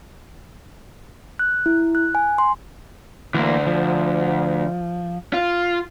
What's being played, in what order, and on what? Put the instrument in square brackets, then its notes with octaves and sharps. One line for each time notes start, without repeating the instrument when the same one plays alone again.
[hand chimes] F#6
E4
F#6
G#5
C6
[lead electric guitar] D2 [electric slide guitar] E3 A#3
[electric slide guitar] F3
[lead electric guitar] F4